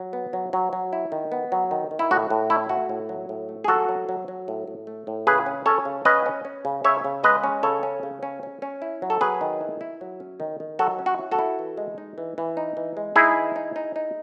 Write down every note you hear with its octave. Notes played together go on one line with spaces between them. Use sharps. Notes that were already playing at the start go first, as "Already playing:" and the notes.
Already playing: F#3
B3
F#3
F#3
F#3
E4
D#3
B3
F#3
D#3
D#3
E4
A2 F#4
A2
A3 E4
A3 F#4
A2
F#3
A2
A3
G#4
F#3 F#4 A4
F#3
F#3
F#3
A2
A2
A3
A2
C#3 G#4 B4
C#4
C#4 A4 C#5
C#3
C#4 B4 D#5
C#4
C#4
C#3
C#3 C#5 E5
C#3
G#3 B4 D#5
C#4
C#3 A4 C#5
C#4
C#3
C#4
C#4
C#4
E4
F#3
A4
F#3 G#4 B4
D#3
E4
E4
F#3
C#4
D#3
D#3
F#3 F#4 A4
C#4
F#4
E4
F#4 A4
E4
E3
G#3
D#4
E3
E3
D#4
E3
G#3
D#4 E4 G#4
E3
D#4
D#4
D#4